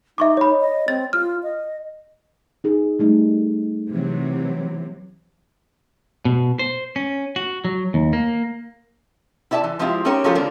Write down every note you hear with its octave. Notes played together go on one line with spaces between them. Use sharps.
D#4 E5 C#6 D6
C#5 B5
D#5
C4 A6
F4 F6
D#5
D#4 G#4
G3 A3 D#4
C3 E3 F#3
B2
C5
C#4
F#4
F#3
D#2
A#3
E4 D5 E5 G#5 A5
E3
F3 G#3 C4 E4 F4 G4
C4 C#4 D#4 G4 A#4 C#5
F3 F#3 G#3 C#4 F4 A4
D3 G3 C4 D4 F4 A#4